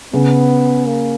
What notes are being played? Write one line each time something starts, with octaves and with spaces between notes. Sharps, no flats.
C#3 B3
A#3